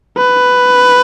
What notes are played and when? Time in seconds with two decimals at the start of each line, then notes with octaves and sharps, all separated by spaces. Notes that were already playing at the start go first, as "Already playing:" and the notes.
0.17 B4